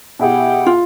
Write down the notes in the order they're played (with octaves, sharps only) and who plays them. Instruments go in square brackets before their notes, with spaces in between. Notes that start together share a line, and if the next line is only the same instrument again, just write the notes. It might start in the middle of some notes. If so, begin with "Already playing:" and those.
[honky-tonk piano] B2 E4 G#4 [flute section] G4 F#5 G5
[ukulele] F4